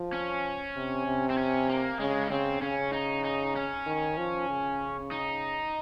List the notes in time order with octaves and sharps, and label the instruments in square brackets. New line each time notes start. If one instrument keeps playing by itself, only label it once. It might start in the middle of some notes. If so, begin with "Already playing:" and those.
Already playing: [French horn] F3
[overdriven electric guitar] C#4
[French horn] C3
C3
[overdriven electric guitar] C4
C#4
A#3
[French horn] C#3 [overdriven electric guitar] G#3
[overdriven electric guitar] C#4
[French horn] C#3 [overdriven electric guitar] C4
[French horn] C#3 [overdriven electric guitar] C#4
[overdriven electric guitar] D#4
D#4
C#4
[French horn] D#3
F3
C#3
[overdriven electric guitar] D#4